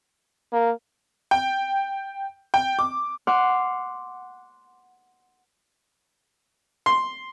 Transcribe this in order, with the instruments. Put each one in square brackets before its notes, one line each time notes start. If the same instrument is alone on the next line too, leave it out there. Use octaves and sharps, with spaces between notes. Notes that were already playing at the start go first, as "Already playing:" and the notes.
[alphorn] A#3
[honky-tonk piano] G5
G5
D6
[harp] F#5 C6 D6 F6 F#6
[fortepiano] C6